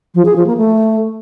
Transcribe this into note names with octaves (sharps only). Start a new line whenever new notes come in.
F3
G#4
F3
A#3
A3